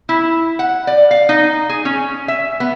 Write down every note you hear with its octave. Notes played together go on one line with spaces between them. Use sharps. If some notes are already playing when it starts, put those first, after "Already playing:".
E4
F#5
D5
F5
D#4
G#4
C#4
E5
B3